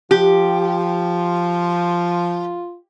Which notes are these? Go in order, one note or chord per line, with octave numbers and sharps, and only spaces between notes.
F3 F4 G4